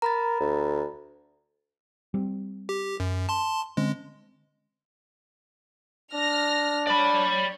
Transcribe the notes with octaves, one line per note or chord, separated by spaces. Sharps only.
A#4 A#5 B5 A6
D2
G3 C4
G4
F#2
A5 C6
D3 G#3 C4 C#4
D4 F6 A#6
C#5 D5 B5